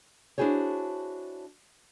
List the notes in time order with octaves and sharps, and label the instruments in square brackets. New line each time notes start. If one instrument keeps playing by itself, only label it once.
[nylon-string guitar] D4 E4 F#4 G#4 C5 C#5